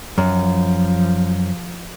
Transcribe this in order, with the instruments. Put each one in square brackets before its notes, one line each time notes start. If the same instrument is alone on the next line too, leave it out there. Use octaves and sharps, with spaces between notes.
[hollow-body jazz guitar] F#2 [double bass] F3